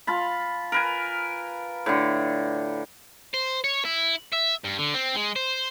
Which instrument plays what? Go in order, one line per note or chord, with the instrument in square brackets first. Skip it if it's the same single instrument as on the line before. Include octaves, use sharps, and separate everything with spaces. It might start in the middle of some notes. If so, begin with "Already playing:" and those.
[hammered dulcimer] F4 A5 B5
A#4 B4 G#5
A2 D3
[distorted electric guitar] C5
C#5
E4
E5
G2
D3
C4
G#3
C5